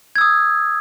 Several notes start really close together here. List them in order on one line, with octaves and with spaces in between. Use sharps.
G#6 E6 D#6